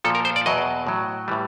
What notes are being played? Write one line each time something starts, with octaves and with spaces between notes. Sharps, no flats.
A#2 F3 A4
A#4
C5
D5
E2 B2 F#3 D#5
A2 F#3
A2 E3 G3